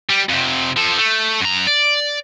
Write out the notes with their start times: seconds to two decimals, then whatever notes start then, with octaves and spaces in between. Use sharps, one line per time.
0.09 G3
0.29 F2 C3
0.76 F3 A4
0.97 A3
1.41 F#2 A#5
1.67 D5